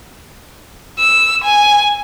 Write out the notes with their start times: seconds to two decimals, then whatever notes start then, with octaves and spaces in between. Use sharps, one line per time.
0.99 E6
1.44 G#5